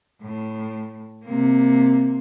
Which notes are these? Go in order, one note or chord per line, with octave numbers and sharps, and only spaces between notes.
A2
C3 A#3